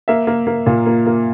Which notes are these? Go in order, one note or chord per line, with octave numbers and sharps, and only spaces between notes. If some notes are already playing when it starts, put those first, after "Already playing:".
A#3 E5
A#3
A#3
A#2
A#3
A#3